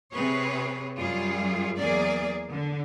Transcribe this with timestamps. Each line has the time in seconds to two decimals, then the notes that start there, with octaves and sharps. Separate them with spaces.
0.12 C3 C4 G#4 B4 C#5
0.96 F#2 G3 F4 G#4
1.77 E2 F#3 A#3 G#4 A#4 D5
2.50 D3